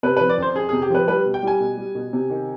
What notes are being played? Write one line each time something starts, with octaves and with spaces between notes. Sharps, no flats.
C3 B4
F3 B4
D5
F2 C5
F2 G#4
C3 G#4
G4
F3 B4
G3 B4
B2
G5
G3 G#5
B2
G3
B2
C3
D#3